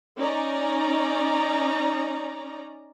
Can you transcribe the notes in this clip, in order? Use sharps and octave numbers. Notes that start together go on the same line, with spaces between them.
C#4 D#4 D5 A#5